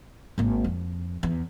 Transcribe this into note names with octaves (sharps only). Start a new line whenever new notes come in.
G#1 A#3
F2
E2